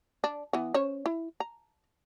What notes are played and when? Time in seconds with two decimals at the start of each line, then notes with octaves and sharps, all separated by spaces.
0.24 D4
0.53 E3 B3
0.74 C#4 C5 C#5
1.06 E4
1.40 A#5